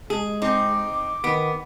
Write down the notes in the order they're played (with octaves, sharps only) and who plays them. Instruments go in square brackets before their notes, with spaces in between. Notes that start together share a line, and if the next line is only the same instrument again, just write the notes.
[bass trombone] G#3 [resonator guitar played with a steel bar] G#4
[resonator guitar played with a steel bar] C4 [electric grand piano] D#4 [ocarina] D6
[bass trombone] D#3 [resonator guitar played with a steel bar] B3 [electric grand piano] D7